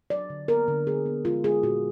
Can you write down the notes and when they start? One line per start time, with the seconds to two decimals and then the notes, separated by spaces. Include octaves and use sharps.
0.10 F#3 D5
0.30 D3
0.48 B3 A#4
0.68 D3
0.87 B3 G#4
1.06 B3
1.25 G#3 F4
1.44 G#3 G#4
1.63 A#2 F#4